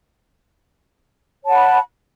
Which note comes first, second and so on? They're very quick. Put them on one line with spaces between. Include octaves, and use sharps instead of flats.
C#5 A5 F#5 B5